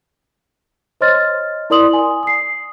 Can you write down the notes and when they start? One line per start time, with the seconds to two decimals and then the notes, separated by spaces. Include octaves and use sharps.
1.01 C5 C#5 D#5 C6 F6 A6
1.70 E4 A#4 D5 C6 D#6 F#7
1.93 G#5
2.23 D#6 C7